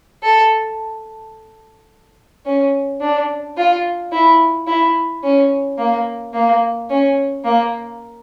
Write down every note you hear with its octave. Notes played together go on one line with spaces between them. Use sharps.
A4
C#4
D4
F4
E4
E4
C#4
A#3
A#3
C#4
A#3